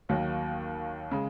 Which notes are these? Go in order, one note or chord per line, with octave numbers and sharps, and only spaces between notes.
D#2 D#3 F#3 A#3
C#3 G#3